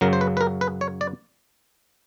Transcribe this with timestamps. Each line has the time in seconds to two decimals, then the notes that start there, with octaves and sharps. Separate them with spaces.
0.01 F#2 C#3 F#3 A#4
0.13 C5
0.21 B4
0.37 B4
0.41 A#4
0.61 B4
0.81 C#5
1.01 D5